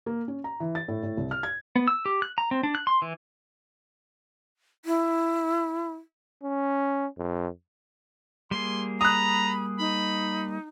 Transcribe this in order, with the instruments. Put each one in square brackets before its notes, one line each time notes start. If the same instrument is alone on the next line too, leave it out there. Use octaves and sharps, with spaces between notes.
[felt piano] A#3
C#4
A#5
E3
A6
A2
A2
C2
F6
G#6
[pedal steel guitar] B3
E6
G4
F#6
A#5
C4
D4
F#6
C6
E3
[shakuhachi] E4
[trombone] C#4
F2
[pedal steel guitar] G3 A#3 G#4 [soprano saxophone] C6
[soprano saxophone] A#5 [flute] B5 [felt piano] D#6 F#6
[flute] D#4 [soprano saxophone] B5